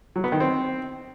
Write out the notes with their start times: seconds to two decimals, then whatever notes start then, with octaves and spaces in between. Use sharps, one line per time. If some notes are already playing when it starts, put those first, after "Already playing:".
0.16 F#3
0.24 B3
0.32 D#3
0.40 C4